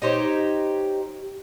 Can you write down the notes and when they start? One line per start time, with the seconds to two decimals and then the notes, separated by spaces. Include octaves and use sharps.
0.02 D#4 G4 C5 C#5